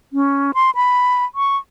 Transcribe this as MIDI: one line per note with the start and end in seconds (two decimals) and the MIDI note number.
0.13 0.51 61
0.54 0.70 84
0.75 1.24 83
1.35 1.57 85